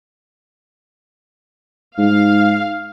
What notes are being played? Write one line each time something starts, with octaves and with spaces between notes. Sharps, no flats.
G#2 F5